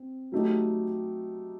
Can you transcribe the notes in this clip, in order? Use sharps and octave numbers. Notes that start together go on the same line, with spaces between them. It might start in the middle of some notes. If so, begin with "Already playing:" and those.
Already playing: C4
F#3 A3 D#4 G4